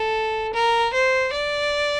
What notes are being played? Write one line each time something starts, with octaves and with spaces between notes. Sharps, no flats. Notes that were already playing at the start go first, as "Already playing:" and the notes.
Already playing: A4
A#4
C5
D5